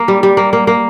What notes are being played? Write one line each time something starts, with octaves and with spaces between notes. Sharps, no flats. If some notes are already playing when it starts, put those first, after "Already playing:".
Already playing: A#3
G3
G3
A#3
A#3
A#3